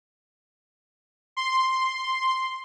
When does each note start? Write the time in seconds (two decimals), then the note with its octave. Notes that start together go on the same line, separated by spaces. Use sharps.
1.37 C6